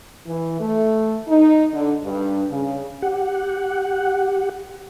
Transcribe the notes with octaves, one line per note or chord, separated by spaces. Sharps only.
E3
A3
D#4
D3
G2
C#3
G4 F#5